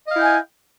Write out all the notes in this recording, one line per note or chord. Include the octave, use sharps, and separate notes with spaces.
E4 D#5 F5 G5 G#5